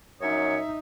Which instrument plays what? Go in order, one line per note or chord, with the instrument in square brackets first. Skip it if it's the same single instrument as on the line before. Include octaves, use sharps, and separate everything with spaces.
[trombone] F#2 [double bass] D#4 [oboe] C#5 [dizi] E5